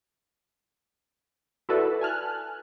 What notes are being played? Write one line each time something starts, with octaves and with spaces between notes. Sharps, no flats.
E4 F#4 A4 B4 D5 E5
G#5 A5 F6 F#6